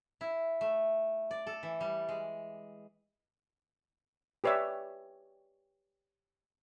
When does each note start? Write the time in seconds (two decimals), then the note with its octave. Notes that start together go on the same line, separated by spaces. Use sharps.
0.21 E4
0.61 A3
1.31 D5
1.47 A4
1.63 E3
1.81 G3
2.09 G#3
4.44 G4 B4 C#5 D5 E5